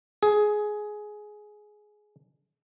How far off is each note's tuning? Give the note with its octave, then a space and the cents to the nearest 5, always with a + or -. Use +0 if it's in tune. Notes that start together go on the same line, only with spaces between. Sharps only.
G#4 +15